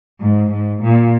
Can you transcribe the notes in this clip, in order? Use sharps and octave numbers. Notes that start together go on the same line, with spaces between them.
G#2
G#2
A#2